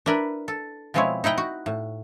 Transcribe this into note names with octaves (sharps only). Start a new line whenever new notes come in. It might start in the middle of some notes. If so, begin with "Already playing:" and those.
D4 E4 A#4 B4
A4
B2 F3 G#3 C4 E4 C#5
D#4 E4 F#5 G5 A#5
F#4
A2